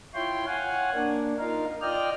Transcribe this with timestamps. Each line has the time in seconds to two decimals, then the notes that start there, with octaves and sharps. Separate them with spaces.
0.14 E4 F4 C#5 G5 C6
0.46 C#5 F5 F#5 G#5
0.94 A#3 D4
1.39 D#4 F4 A#4 F5
1.82 F4 D5 D#5 G5 F6